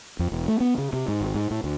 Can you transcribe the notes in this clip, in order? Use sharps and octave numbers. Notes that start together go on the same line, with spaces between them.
F2
E1
A3
B3
C#3
C3
G#2
G#1
G#2
A2
D2